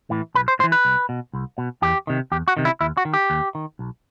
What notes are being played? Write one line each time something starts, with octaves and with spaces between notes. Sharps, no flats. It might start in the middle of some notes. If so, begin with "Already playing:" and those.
A2 E3
B1 B4
C5
A2 C5
E3
B4
C2
B2
C2
B2
E2 G4
C3 D#3
E2 G4
F#4
C3 D#3
E4
D#2 E4
F#4
D#3
G4
D#2
D#3
B1